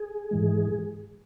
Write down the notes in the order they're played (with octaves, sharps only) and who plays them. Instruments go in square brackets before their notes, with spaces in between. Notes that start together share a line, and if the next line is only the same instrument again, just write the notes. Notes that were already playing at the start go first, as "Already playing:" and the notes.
Already playing: [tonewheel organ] G#4
G#2 E3 G#3